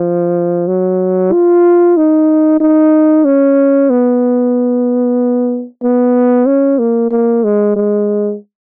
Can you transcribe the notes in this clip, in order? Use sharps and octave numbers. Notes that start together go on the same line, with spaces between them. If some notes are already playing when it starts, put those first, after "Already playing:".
Already playing: F3
F#3
F4
D#4
D#4
C#4
B3
B3
C#4
A#3
A#3
G#3
G#3